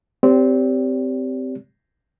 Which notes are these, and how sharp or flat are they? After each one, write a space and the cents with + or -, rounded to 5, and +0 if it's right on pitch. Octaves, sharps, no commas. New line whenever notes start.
C4 -15 G4 +0 D5 -45